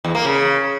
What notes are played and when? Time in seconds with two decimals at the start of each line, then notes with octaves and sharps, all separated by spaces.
0.05 E2
0.15 A#3
0.25 C#3